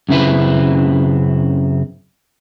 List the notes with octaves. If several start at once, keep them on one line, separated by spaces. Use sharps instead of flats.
F#2 C#3 C4 E4 B4